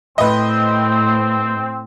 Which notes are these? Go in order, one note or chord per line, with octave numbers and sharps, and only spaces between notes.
A2 C4 B4 D#5